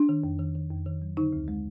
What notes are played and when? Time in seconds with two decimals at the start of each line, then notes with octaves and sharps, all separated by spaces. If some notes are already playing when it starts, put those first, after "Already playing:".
Already playing: D4
0.09 D#3
0.24 F2
0.39 D#3
0.55 D#3
0.71 F2
0.86 D#3
1.02 F#3
1.17 D3 D#4
1.33 D2
1.48 G#3